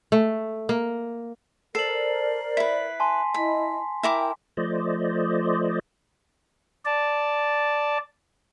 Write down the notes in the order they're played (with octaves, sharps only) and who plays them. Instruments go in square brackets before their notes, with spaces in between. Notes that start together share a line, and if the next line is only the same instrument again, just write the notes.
[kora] A3
A#3
[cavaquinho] A4 [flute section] A#4 C5 D5 [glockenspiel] C7 F#7
[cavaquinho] E4 B4 [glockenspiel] B6
[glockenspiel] G#5 A5 C6
[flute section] E4 D#5 [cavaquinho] B5
[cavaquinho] E4 A#4 D6 [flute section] G5
[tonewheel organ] F3 A3 C5 D5 D#5
[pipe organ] D5 A5